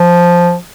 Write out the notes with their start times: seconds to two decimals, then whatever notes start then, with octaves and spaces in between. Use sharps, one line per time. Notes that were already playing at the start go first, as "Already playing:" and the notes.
Already playing: F3